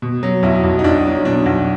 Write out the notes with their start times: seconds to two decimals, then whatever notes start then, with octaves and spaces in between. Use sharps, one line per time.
0.02 B2
0.23 F#3
0.43 B1 E4
0.64 B1
0.79 D#4
0.84 B1 D4
1.05 F#3
1.25 B2 D4
1.46 B1